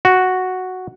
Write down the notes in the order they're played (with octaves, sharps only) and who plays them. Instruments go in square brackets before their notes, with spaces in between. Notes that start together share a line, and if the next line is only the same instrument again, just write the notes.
[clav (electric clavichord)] F#4